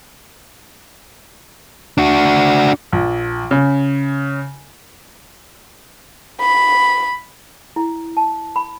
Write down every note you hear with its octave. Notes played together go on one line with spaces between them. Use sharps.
D4 F#4
A#1
C#3
B5
E4
A5
B5